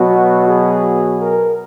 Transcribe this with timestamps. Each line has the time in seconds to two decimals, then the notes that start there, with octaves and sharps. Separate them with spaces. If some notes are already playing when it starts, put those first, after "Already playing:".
Already playing: B2 F#3 B3 F#4
0.48 G#4
1.20 A#4